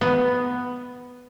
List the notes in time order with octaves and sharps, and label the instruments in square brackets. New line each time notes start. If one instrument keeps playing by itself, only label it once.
[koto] B3